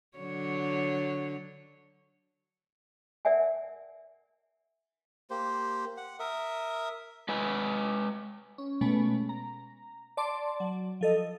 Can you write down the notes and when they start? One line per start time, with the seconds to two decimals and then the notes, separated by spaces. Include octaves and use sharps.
0.18 D3 F#3 C#5
3.25 A#4 D5 E5 F#5 G#5
5.30 A#3 G4 C5
5.97 F#5
6.20 A#4 E5 D#6
7.29 G#3 B4 D#5 G#5
8.58 C#4
8.81 B2 G#3 A3 B3 C#4
9.29 A#5
10.17 D5 A5 C6 D6
10.60 F#3
11.01 F3 A4 D#5